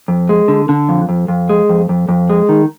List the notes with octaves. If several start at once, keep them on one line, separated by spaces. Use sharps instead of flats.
F2
G#3
D3
D3
F2
F2
F2
G#3
F2
F2
F2
G#3
D#3